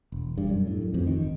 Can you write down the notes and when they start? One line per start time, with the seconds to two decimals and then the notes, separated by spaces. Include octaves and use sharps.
0.12 E1
0.38 G2
0.49 F#2
0.67 A2
0.81 F#2
0.94 F2
1.07 D#3
1.23 G1